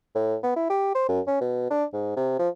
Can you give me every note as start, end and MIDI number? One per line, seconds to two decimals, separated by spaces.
0.15 0.36 45
0.43 0.53 59
0.56 0.65 64
0.70 0.93 67
0.95 1.07 72
1.09 1.20 42
1.27 1.39 61
1.41 1.70 47
1.70 1.85 62
1.93 2.16 44
2.16 2.39 48
2.39 2.49 53